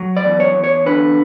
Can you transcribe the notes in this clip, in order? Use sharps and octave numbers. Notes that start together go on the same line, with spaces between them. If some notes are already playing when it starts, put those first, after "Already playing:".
Already playing: F#3
D5
E2
C#5
E2
C#5
D3 B4